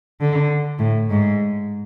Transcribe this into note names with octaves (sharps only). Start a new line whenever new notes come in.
D3
A2
G#2